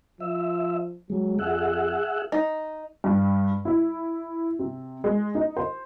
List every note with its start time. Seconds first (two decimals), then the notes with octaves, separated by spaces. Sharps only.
0.20 F3 E5
1.10 F#3 G#3
1.39 F2 G#4 E5 F#5
2.32 D#4
3.04 G2
3.65 E4
4.59 C3
5.04 G#3
5.35 D#4
5.57 C5